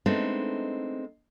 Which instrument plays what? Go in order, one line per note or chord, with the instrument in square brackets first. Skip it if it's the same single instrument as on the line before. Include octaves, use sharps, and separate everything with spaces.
[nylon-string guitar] G#3 A3 B3 C4 D4 D#4